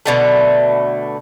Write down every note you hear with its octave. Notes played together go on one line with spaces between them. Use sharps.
B2 D3 A3